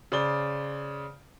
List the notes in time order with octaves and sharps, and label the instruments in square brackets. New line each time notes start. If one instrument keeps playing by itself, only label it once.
[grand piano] C#3 C5 D5 G7